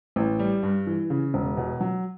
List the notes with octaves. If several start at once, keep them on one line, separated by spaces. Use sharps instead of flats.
A1
G3
G2
E3
C#3
E1
B2
F#3